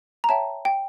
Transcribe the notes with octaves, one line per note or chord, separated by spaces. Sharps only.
A#5
C#5 E5 G5 A5
G5